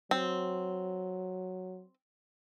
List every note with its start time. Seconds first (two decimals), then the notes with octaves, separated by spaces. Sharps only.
0.11 F#3 C4